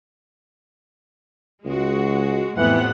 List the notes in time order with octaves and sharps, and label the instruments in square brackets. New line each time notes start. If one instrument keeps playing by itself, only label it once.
[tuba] C#2 [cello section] G#3 F#4
[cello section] F2 A2 C3 [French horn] E3 [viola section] B3 F#5